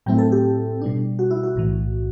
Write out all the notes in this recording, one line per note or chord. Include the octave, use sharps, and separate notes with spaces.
A2 F#3 A3 C4 E4 G5
A4
G4
B2 G3 D4
F#4
E4
F#4
B1 A2 E3